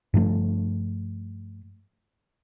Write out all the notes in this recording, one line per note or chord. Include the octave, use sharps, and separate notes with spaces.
G2 F3 A3